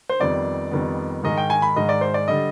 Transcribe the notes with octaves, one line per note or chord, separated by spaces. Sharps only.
C5
F2 D#3 G3 B3 D5
F2 D#3 G3 B3
G#2 D#3 G#3 D#5
G5
G#5
B5
G#2 D#3 G#3 D#5
D5
C5
D5
D3 G3 D#5